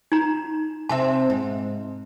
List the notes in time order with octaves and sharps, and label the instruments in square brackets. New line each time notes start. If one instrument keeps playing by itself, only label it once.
[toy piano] D#4 A#5
[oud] C3 C4 E5 [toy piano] A5
[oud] G#2